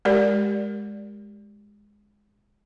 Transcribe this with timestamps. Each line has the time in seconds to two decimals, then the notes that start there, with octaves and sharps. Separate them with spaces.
0.05 G#3 G4 A#4 D5